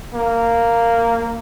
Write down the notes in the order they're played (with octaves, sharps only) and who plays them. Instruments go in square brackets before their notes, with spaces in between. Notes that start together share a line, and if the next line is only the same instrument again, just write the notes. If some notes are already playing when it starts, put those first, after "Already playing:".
[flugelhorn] A#3